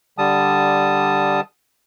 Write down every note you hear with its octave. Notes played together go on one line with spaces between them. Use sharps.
D3 G3 A5 D#6